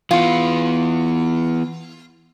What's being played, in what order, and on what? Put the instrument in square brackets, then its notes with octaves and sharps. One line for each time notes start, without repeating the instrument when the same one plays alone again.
[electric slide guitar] E3 B3 [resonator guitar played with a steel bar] F4